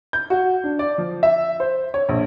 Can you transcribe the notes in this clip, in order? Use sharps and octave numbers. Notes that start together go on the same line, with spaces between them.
G6
F#4
D4
D5
F3
E5
C5
C#5
A#1